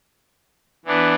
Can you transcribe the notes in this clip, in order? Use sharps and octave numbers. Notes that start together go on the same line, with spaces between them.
E3 B3 D4